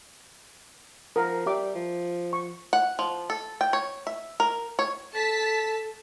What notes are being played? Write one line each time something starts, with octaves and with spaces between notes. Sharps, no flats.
F3 A#4 F#5 A#5
G3 G4 E5 D6
F3
C#6
F#5
F3
A4
G5
C#5
E5
A#4
C#5
A4 A5 B6